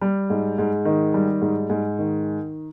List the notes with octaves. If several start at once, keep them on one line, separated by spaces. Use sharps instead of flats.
G3
G#2
G#2
D#3
G3
G#2
G#2
D#3